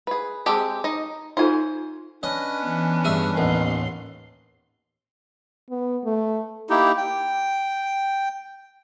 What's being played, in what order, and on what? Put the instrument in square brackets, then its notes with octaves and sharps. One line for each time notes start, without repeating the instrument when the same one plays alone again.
[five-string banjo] G#4 B4
[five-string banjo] G#3 C4 G4 [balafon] G#4 A5
[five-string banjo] D#4 D#5
[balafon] D#4 F4 A4 [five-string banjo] C5 G#5
[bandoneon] C#4 D4 B4 [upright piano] C#5 [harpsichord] D#5
[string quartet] E3 B3
[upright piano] G2 D#7 [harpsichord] G#4 E5
[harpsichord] A1 [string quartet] D#2 C6 [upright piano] A#3 B3 D#4
[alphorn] B3
A3
[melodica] A#3 D#4 E4 G4
G5